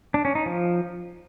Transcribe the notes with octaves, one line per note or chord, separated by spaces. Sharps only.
D4
C#4
D#4
F3